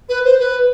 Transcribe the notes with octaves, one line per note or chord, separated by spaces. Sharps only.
B4
C5
B4